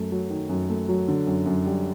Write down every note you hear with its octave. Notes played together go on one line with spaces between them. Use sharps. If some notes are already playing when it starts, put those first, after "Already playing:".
Already playing: F#2 A3
F#3
D#3
F#2
A3
F#3
D3
F#2
F#2
G3